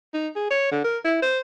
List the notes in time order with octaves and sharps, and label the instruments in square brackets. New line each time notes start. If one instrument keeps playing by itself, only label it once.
[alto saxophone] D#4
G#4
C#5
D3
A#4
E4
C5